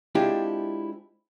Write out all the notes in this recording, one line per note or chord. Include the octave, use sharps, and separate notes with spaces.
G#3 C4 D4 E4 F4 G4